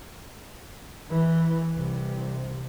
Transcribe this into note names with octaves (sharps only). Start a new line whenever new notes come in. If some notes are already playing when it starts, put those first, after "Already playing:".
E3
C2 C3